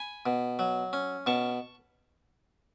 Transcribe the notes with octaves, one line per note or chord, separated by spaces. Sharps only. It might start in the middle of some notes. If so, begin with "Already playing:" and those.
Already playing: G#5 B5
B2
F#3
C#4
B2 A5 C#6